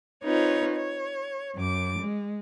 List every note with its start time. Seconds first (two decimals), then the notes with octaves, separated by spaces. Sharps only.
0.23 C4 D#4 F4 B4 C#5
0.76 C#5
1.56 F#2 D6
2.00 G#3